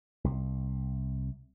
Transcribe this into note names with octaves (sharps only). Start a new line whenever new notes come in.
C2